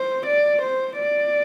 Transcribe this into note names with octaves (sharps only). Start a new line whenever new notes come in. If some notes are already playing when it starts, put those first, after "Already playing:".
Already playing: C5
D5
C5
D5